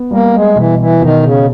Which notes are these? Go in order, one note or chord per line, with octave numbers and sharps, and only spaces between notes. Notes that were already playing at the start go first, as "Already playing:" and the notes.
Already playing: B3
G3 A#3
G#3
B2 E3
E3
B2 D#3
C#3